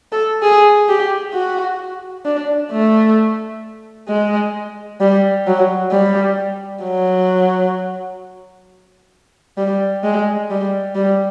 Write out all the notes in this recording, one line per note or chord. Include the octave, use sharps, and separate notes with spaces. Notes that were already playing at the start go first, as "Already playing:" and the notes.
A4
G#4
G4
F#4
D4
A3
G#3
G3
F#3
G3
F#3
G3
G#3
G3
G3